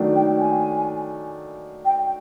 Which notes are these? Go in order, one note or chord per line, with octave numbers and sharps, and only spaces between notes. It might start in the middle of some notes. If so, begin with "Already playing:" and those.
Already playing: D#3 F#3 A3 D4
G5
G#5
G5